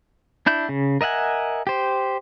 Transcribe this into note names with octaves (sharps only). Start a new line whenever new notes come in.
D4 E4 G6
C#3
A#4 D#5 E5 F#5 G#5
G4 C5